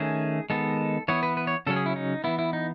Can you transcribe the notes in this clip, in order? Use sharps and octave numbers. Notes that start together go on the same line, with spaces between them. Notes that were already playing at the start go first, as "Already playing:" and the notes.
Already playing: D#3 A3 C#4 G#4
D#3 G#3 B3 A4
E3 B3 C#5
B4
B4
C#5
C#3 F#3 C#4 A4
G#4
E4
D#4
E3 B3 E4
E4
D#4